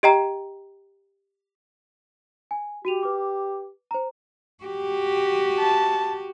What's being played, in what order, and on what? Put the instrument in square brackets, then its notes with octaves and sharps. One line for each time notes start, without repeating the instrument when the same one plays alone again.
[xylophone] G4 D#5 G5 A#5
[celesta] G#5
[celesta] F#4 D#7 F7 [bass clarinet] G4
[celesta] B4 D6
C5 A#5
[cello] F#4 G4
[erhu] A5